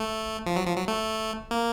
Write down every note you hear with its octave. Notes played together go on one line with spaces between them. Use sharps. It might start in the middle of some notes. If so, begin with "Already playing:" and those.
Already playing: A3
F3
F#3
F3
F#3
A3
A#3